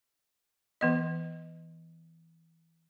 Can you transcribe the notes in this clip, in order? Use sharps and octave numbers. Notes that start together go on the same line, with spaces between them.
E3 B3 D#5